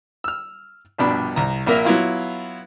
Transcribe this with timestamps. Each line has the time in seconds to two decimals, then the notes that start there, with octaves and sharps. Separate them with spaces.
0.24 E6 F6
0.98 A#1 G2 B2 D4 B5
1.36 C2 A#5
1.66 A#1 A#2 A#3 A#4 E5
1.85 F#3 B3 E4 F4